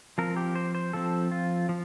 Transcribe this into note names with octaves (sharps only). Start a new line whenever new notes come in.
F3 C4 A#4
G4
C5
C5
F3 C4 A4
F4
F3